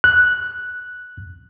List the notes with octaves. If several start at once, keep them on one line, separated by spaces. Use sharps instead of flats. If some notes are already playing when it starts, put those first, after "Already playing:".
F#6